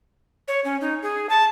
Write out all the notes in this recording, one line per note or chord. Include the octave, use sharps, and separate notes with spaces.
C#5
C#4
D#4
G#4
A5